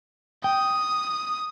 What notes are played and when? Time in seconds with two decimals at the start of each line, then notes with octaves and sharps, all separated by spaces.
0.44 G5 D#6